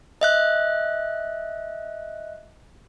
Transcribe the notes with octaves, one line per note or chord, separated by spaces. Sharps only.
D#5 E5 F#6